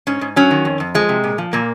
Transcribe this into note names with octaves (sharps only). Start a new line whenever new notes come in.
G#2 C#4
G#2
F#3 C#4
D#3
F2
F2
F3 G#3
C3
A#2
F3
A#2 A#3